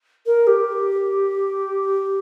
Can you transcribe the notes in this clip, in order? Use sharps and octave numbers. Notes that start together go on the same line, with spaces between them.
A#4
G4